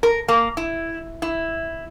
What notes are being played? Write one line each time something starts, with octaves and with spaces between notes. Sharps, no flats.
A#4
A#3
E4
E4